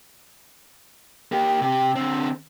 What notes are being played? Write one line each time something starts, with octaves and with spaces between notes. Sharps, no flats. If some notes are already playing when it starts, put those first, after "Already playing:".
A#3 G4
C3 G4
D3 C4